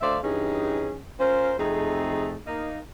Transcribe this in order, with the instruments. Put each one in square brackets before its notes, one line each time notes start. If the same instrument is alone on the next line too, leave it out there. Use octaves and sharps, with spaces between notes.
[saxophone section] D2 A3 C5 D5 E5 F5
G2 E3 C#4 D#4 G#4
C#4 F4 A#4 C5
F2 C3 A3 D#4 G#4
A#3 D#4